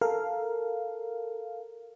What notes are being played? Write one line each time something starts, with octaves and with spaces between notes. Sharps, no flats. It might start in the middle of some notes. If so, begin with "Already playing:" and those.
A4 A#4 F5